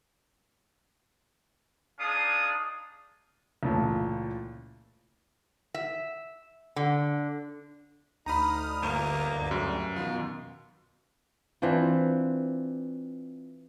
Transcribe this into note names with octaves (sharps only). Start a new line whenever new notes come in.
D4 D#4 G#4 D5 F5 D#6
C#2 A#2 E3 A3
E5
D3
D2 D#4 A#5 B5 D#6 F6
G1 A#3
D2 G2
F#2 C#3
B2 D#3 F4
E3 C4 D4 F4